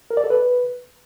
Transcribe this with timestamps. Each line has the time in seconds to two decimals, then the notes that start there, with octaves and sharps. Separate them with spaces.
0.11 A#4
0.17 D5
0.24 A4
0.30 B4